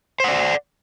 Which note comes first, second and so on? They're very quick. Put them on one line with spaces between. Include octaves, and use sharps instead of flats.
C5 F#5 D5